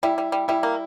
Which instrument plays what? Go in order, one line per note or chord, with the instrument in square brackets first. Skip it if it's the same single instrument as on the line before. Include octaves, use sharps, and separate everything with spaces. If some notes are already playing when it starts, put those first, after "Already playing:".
[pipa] G3 [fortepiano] E4
[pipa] G3
G3
[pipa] G3 [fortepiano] E4
[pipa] A#3